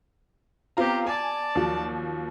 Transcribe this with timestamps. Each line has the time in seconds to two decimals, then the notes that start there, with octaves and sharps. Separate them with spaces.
0.77 B3 C4 F4 G4 A#5
1.07 D5 G#5 A5
1.55 D#2 F3 F#3